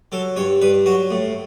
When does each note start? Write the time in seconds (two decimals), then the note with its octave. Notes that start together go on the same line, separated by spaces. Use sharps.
0.12 F#3 A4
0.36 G2 C#5
0.62 G2 B4
0.86 F#3 F#4
1.11 A2